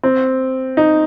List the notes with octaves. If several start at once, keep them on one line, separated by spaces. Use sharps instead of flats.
C4
D#4